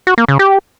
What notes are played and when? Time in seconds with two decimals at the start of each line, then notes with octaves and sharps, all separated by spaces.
0.07 F#4
0.18 A#3
0.28 C#3
0.39 G4